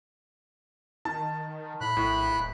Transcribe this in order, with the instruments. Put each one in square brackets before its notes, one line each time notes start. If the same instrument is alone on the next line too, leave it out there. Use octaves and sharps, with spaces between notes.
[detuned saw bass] D#3 [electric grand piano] A5
[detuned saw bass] A2 [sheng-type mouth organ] B5 F#6
[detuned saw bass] A#1 [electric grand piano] A2
[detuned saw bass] D#1